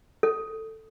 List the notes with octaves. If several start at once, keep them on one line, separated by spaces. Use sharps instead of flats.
A4